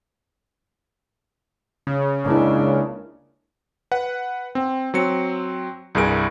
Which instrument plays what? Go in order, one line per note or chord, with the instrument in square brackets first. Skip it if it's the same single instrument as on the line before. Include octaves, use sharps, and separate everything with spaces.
[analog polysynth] C#3
[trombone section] C#2 G#3 [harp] A#3 E4 [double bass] D4
[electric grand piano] B4 F#5
C4
F#3 C4 C#7
C2 G2 G#4 A#4 D7